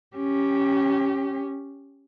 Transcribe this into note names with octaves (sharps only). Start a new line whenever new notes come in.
C#4 G4